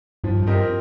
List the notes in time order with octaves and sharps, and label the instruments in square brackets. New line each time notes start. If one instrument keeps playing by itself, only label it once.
[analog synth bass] G2 [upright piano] F3
[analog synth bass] G2
[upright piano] C4 G4 A#4 D#5